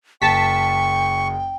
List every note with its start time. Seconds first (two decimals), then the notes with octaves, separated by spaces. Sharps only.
0.22 F#1 G5 A5 C#6 B6